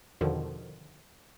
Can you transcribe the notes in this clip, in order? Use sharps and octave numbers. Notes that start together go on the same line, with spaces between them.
E2 B2 D3 D#3 F3